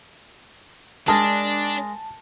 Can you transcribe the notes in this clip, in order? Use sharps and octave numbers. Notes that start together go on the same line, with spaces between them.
G#3 D4 G#4 A#4 A5